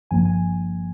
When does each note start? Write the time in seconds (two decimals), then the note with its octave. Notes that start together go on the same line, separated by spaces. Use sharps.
0.11 G1 G2 F3 A#3 G#5
0.25 G#5